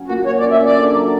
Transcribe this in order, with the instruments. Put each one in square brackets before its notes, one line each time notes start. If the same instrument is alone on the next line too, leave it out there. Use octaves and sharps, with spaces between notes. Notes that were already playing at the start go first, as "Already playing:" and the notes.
Already playing: [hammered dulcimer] F#3 C#4
[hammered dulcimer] A#2 [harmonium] F#4
[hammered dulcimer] C#4 [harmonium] C#5
[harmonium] D5
[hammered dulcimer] C#4
[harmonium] E5
[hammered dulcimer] C#4 [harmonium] D5
[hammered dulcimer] D3
F#3